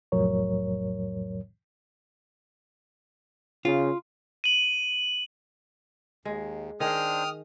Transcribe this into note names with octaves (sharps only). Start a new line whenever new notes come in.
C2 F2 A2 F#3 A#4 C#5
C#3 F4
D#7 F#7
D#2 G#3
D#3 D4 G#4 C5 G5 D#6 F6